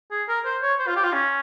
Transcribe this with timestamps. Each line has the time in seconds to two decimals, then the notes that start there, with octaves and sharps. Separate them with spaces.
0.11 G#4
0.28 A#4
0.45 C5
0.62 C#5
0.79 C5
0.87 F4
0.96 G4
1.04 F4
1.13 C#4